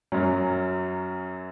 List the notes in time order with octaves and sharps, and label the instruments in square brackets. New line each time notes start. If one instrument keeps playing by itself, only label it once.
[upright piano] F#2 F#3 C#4